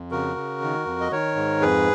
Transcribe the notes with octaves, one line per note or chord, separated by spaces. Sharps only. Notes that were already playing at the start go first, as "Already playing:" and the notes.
Already playing: F2
C#3 F#4 A#4
C#3
D#3
F2
D#5
D#3 A#4 C#5
G#2
F2 G#4 B4